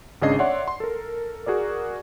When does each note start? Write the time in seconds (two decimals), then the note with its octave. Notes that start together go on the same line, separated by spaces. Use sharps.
0.22 G#1 C#3 D4 G#4 D#5 C7
0.39 C#5 D5 E5 F#5 C6
0.68 C6
0.80 A4 A#4
1.46 F#4 G#4 A#4 D5